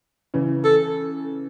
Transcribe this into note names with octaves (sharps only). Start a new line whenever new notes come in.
C#3 E3
A4